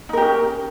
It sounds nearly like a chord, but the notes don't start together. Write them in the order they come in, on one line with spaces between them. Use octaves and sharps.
D#4 A#4 G4 C#4